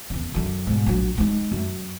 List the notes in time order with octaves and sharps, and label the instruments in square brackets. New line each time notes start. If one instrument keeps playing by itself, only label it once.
[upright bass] E2 C#3
F#2 D3
G#2 B2
A#1 F#3
G#3 D#4
F#2